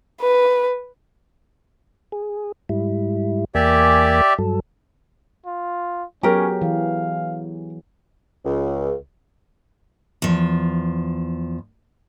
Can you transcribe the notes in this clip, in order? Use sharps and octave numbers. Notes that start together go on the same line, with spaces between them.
B4
G#4
G#2 G3 E4
E2 A#3 G4 D5 E5 G#5
G2 F#3 A4
F4
F#3 B3 C#4 G4 G#4 A#4
E3 F5
C#2
E2 F3